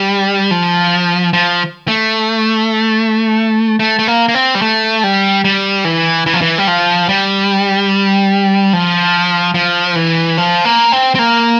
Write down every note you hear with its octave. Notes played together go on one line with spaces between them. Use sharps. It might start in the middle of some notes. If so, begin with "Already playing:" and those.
Already playing: G3
F3
F3
A3
A3
A3
A#3
A#3
C4
G3
A3
G3
G3
E3
E3
F3
E3
G3
F3
G3
F3
F3
E3
F3
A#3
C4
C4
A#3